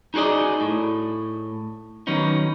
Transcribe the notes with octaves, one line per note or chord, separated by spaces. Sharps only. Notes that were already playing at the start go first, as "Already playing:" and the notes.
D#4 F#4 G#4 D5 D#5
A2
D#3 F#3 B3 C#4 D#4